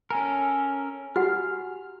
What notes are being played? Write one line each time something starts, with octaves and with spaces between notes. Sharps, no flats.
C#4 A4 A#4 G#5 A#5
F#4 G4 F#5 F6